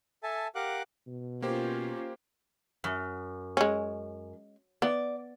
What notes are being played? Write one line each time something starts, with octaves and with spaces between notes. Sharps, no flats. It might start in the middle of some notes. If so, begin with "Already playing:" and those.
A4 E5 G#5 A5
G4 A#4 F5 F#5 D6 F#6
B2
A#3 C#4 F4 G4 C5
F#2
G#3 C#4
B3 D5